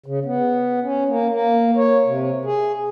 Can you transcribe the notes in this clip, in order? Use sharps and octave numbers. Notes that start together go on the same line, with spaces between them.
C#3
B3
C#4
A#3
A#3
C#5
C3
G#4